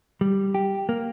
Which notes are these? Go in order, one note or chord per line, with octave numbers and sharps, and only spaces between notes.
G3
G4
A#3